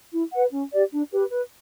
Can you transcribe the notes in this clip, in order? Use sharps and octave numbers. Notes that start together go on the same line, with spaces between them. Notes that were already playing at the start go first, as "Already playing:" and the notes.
E4
B4 F#5
C#4
G4 D5
D4
G4 B4
B4